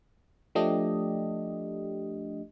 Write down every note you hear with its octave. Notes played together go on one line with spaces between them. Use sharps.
F3 A3 D4 G4 D#5